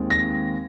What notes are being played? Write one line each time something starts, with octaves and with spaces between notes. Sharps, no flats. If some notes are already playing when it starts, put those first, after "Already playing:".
Already playing: D#2 D#3 G#3 C4
A#6